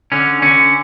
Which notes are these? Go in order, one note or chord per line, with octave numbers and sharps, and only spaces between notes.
D3 C#4
D3 C#4